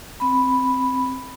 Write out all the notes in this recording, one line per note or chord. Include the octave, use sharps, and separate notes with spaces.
C4 B5